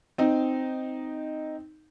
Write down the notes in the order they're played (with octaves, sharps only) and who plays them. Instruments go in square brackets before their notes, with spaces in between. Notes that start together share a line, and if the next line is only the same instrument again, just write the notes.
[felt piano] C4 D#4